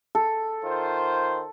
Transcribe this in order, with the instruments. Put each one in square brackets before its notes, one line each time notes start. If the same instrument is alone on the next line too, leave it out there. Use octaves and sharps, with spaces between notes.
[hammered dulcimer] A4
[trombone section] D#3 F4 C5